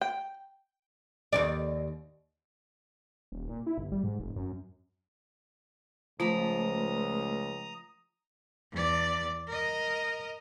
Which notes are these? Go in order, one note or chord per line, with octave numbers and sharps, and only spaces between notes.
G5
D#2 A#2 D5
D#1
A#2
E4
G1
G3
G#2
F1
F#2
C#2 F3 A3 A#5 B5 D#6
E2 D5
A#4 D#5